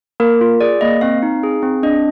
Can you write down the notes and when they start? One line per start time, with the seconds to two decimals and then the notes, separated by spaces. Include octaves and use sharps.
0.20 A#3 A#4
0.41 F4
0.61 G#4 D5
0.81 A#3 D#5
1.01 C4 F5
1.23 D#4
1.43 G#4
1.63 C4
1.83 D4 D#5